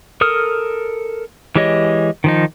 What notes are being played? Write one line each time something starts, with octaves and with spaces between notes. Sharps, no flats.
A4 A#4 D#6 F6
E3 G#3 G4 C#5 D#5
D#3 F3 D#4